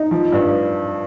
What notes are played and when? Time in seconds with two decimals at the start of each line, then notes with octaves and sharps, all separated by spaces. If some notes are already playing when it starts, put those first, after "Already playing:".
Already playing: D#4
0.11 F3
0.32 G2